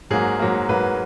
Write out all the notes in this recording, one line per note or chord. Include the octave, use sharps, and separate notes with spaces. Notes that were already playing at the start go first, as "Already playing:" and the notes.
G#2 F#3 A#3 G#4
G#2 F#3 A#3
G#2 F#3 A#3 B4